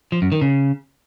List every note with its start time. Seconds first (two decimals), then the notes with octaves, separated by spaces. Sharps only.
0.12 F3
0.22 F#2
0.32 D#3
0.41 C#3